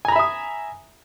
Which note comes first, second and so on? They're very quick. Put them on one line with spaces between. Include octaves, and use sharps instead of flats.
G#5 A#5 B5 E5 D#6